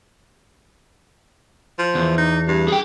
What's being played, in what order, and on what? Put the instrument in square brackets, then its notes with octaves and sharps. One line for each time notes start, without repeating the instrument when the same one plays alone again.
[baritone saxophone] F3
[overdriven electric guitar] E2
[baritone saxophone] D#4
G2
[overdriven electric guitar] G#4 G5